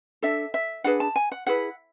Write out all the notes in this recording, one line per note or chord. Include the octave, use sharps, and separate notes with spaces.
D4 A4 E5
E5
D4 G#4 B4 F#5
A5
G#5
F#5
E4 G#4 B4 F#5